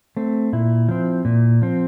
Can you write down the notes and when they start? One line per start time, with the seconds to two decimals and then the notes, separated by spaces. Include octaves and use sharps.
0.17 A3 C4
0.53 A#2 E4
0.89 F3 C4
1.25 A#2
1.62 F3 C4